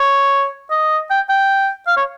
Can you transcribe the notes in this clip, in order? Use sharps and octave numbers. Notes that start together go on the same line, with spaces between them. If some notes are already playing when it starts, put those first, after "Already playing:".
Already playing: C#5
D#5
G5
G5
F5
C#5